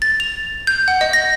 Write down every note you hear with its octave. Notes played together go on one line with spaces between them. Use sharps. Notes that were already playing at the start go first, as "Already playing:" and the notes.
A6
F7
G6
F#5
D#5
A#6